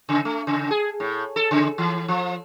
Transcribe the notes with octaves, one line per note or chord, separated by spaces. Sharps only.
C#3
A3
C#3
G#4
A2
A4
C#3
E3
F3